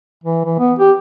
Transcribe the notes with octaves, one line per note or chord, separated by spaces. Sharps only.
E3
E3
B3
G4